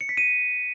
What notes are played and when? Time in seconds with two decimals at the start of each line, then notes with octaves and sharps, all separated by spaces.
0.01 C#7
0.09 B6
0.17 D#7